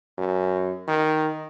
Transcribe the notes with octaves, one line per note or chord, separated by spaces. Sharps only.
F#2
D#3